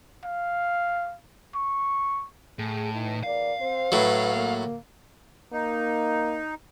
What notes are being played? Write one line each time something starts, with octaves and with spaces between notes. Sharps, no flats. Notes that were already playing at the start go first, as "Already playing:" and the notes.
F5
C#6
A2 G#4
E3 D#4
E2 A#4 D5 F5
C4 C5
A2 F#3 B4
A#3
A#3 D#4